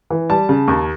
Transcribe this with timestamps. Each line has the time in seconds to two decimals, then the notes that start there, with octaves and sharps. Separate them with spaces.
0.10 E3
0.30 G3 A5
0.49 C#3
0.68 D#2